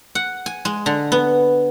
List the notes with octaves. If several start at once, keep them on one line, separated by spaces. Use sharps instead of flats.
F#5
G#5
G#3
D3
B3